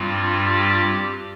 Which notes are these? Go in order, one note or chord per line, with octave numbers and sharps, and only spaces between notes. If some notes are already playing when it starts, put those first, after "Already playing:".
Already playing: G2 G3 C4 F4
G4